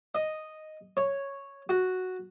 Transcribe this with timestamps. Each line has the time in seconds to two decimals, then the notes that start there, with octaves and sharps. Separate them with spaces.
0.15 D#5
0.97 C#5
1.69 F#4